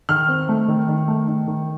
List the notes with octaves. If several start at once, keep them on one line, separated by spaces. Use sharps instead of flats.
D#3 F6
C4
A3
D#3
D#3
A3
D#3
D#3